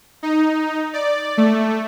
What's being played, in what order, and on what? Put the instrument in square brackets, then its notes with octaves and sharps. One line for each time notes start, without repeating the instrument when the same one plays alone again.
[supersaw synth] D#4
D5
A3